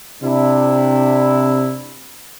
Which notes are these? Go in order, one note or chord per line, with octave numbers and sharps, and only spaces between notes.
C3 D4 E4